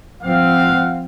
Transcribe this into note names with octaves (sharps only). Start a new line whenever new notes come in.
F3 C4 F5 F#5